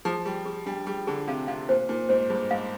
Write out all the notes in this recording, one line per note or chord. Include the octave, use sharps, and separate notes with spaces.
F3 G#4
G3 G#4
G#4
G3 D4
G3 G#4
D3 G#4
C3 F5
C3 F5
A#2 C5
A#2 D#4
G#2 C5
G2 G#4
G#2 F5